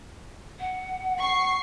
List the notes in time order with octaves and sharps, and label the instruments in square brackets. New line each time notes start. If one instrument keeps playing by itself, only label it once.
[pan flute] F#5
[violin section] C#6 C7